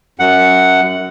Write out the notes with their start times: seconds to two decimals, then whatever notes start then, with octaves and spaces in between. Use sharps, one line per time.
0.19 F#2 F#5